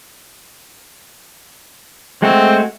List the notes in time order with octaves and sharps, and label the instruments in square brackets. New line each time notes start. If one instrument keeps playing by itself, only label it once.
[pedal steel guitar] G#3 A3 F#4 [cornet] C4